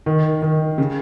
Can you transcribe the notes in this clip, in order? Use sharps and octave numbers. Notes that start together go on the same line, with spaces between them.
D#3
D#3
C#3